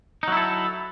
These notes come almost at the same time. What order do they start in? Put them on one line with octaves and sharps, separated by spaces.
D#4 F#3 E4 A4